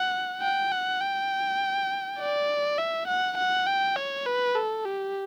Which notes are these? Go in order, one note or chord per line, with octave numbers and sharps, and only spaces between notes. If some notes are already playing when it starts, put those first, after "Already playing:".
Already playing: F#5
G5
F#5
G5
D5
E5
F#5
F#5
G5
C#5
B4
A4
G4